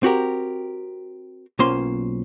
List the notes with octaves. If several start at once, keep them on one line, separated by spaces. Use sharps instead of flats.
C4 F#4 G4 A#4
B1 A#3 C#4 F4 C5 C6